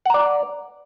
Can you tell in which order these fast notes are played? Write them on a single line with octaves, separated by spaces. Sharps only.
F#5 A#5 D5